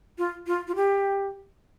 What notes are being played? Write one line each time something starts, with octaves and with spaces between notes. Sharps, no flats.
F4
F4
F4
G4